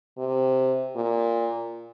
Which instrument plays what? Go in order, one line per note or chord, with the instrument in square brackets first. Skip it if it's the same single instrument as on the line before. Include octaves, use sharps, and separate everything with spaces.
[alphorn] C3
A#2